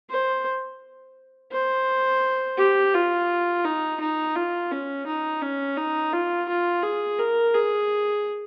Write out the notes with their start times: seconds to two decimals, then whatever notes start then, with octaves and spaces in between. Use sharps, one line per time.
0.10 C5
1.52 C5
2.58 G4
2.94 F4
3.65 D#4
4.00 D#4
4.35 F4
4.72 C#4
5.06 D#4
5.42 C#4
5.77 D#4
6.13 F4
6.49 F4
6.83 G#4
7.19 A#4
7.55 G#4